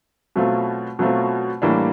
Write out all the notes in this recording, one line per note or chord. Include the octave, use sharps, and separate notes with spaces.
B2 F#3 A3 C4 F4
B2 F#3 A3 C4 F4
A2 E3 G3 A#3 D4